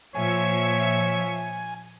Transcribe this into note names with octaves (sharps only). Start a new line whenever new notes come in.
A#2 F3 C#5 E5 G#5 C#7